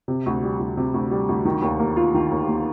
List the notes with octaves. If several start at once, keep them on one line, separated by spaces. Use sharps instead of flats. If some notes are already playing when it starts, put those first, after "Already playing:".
C3
D2
G3
D2
C3
D2
G3
D2
D#3
D#2
A#3
F4
D#3
D#2
A#3